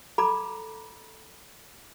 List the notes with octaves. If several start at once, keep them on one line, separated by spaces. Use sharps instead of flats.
A4 A#5 B5 D6